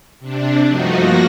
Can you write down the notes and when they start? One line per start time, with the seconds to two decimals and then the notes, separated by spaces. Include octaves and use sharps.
0.20 C3 D4
0.65 G2 F3 A3 D#4 F#4
0.96 F3 A#3 F#4 A#6